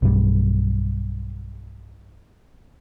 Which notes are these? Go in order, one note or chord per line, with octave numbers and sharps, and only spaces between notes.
B1 G2 G3